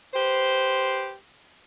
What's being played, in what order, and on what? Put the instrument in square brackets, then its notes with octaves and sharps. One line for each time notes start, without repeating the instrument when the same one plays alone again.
[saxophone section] G4 B4 C5